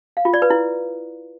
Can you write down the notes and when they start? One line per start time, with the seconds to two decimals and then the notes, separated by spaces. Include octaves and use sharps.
0.17 F5
0.25 F4
0.34 D5
0.42 B4
0.50 E4